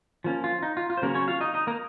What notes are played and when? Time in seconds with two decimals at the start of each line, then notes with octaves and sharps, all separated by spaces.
0.24 F3 A#3 C#4
0.44 F4
0.63 D#4
0.77 F4
0.90 F4
0.97 C5
1.02 C#3 F#3 A#3 C#4 A#4
1.15 C#4 C#5
1.28 F4 F5
1.41 D#4 D#5
1.54 D#4 D#5
1.67 A#3 A#4